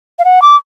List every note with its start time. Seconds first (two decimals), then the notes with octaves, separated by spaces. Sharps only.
0.19 F5
0.25 F#5
0.42 D6